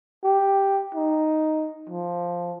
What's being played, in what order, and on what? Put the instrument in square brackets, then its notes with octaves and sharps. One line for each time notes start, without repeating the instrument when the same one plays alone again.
[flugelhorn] G4
D#4
F3